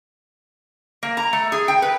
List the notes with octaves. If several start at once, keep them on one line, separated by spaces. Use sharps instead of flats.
A#3
A#5
A3
G#4
G5
B4